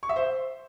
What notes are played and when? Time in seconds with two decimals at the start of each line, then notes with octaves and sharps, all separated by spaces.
0.03 C#6
0.09 E5
0.16 C5